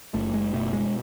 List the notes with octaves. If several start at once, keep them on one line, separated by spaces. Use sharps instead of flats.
F#1 A3
G#3
B2 A3
G#3